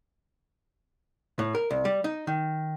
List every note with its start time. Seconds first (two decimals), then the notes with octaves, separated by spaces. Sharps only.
1.39 A2
1.55 A#4
1.71 C2
1.85 G3
2.04 D#4
2.27 D#3